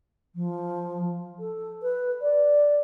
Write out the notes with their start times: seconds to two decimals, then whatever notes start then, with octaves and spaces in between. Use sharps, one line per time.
0.35 F3
1.39 A4
1.82 B4
2.21 D5